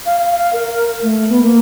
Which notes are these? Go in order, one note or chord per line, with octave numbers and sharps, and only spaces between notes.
F5
F5
F5
A#4
A3
B3
A#3